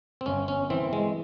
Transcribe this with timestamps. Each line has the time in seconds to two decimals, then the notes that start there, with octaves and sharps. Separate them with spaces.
0.21 C4
0.26 G1 C#4
0.48 C#4
0.70 E3 C4
0.93 G#3